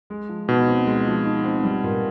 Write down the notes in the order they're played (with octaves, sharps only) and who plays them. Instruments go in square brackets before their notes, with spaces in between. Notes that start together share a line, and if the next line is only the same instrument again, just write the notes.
[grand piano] G#3
F3
[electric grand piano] B2 [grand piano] D#4
[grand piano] C4
G#3
F3
D#4
C4
G3
A#2